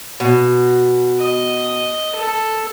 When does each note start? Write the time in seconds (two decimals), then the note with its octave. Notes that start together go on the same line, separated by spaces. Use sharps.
0.20 B2
1.20 D#5
2.15 A4